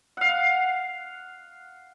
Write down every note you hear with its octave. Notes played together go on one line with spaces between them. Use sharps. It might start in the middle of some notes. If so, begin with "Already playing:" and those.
F5 F#5